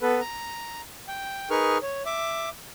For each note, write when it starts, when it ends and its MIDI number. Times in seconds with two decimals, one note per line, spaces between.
0.02 0.20 59
0.02 0.20 69
0.02 0.20 71
0.21 0.81 82
1.08 1.49 79
1.50 1.78 63
1.50 1.78 68
1.50 1.78 70
1.50 1.78 71
1.50 1.78 85
1.50 1.78 89
1.82 2.03 73
2.06 2.49 76
2.06 2.49 86